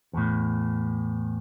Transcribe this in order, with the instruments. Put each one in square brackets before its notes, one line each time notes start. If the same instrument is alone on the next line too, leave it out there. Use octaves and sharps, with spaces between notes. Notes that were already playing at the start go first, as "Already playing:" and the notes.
[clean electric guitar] E2 A2